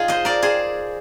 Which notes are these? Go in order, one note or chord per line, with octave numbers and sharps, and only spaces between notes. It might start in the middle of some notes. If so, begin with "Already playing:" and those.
Already playing: D#4 F4 G#4
C5 D#5
A#4 D5
G#4 C5